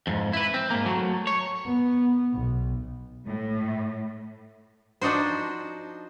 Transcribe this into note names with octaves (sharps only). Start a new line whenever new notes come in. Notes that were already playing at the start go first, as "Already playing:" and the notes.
F2 G#2
E4 B4
C4
G#2 A#3
F#3 A3
C#5
B3
B1
A2
F3 D4 D#4 F#4 C5